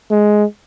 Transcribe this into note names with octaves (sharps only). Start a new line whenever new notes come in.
G#3